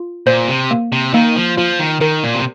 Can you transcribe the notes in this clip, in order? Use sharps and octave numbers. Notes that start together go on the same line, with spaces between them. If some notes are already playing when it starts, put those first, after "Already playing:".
Already playing: F4
A#2 C5
C3
A#3
C3
D#3 A#3
F3
F3 F4
D#3
D#3 A#4
A#2
C3